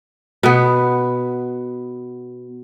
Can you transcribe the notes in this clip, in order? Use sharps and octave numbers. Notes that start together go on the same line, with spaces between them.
B2 B3